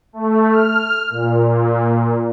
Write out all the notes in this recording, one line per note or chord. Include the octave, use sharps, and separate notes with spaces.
A3
F6
A#2